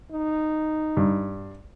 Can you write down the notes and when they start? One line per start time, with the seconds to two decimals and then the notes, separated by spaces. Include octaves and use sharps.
0.11 D#4
0.97 G2